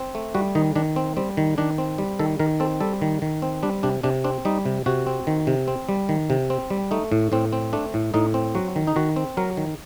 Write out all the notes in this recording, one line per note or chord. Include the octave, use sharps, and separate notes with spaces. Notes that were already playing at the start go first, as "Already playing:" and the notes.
Already playing: C4
A3
G3 F#4
D#3 D#4
D#3 D4
C4
G3 C4
D#3
D#3 D4
C4
G3
D#3 A4
D#3 A#4
C4 A4
G3 A4
D#3
D#3
C4
G3 D4
C3 D4
C3 D4
C4 D4
G3 D#4
C3
C3 F#4
C4
D#3
C3
C4
G3
D#3
C3
C4
G3
A3 D#4
A2
A2 C4
C4
A3 D4
A2
A2 D#4
C4
F#3 F#4
D#3
D#4
D#3 F#4
C4
F#3 A#4
D#3